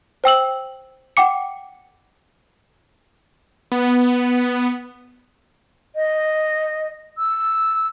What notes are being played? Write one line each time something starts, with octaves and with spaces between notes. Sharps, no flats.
C5 G5 E6 F#7
F#5 G5 D6 C#7
B3
D#5
E6